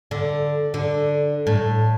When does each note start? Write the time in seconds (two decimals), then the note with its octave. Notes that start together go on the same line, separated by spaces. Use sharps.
0.11 D3
0.74 D3
1.47 A2